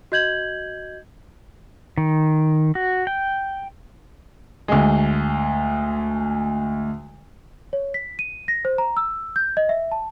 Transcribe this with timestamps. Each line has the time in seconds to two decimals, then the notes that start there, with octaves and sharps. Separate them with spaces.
0.12 F#4 D#5 G6 G#6 F#7
1.98 D#3
2.75 F#4
3.07 G5
4.68 D2 G#3
7.73 C#5
7.94 B6
8.19 D#7
8.48 A#6
8.65 C5
8.78 A#5
8.97 E6
9.36 G6
9.57 D#5
9.69 E5
9.91 A5